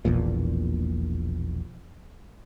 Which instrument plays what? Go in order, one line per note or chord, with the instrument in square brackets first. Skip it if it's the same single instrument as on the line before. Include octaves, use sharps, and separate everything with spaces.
[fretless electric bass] E1 A#1 E2 A#2